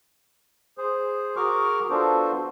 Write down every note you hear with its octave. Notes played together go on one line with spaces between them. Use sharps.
G#4 C5
F#4 G#4 A#4 C#6 D6 F6
B3 D4 F4 F#4 A4 C5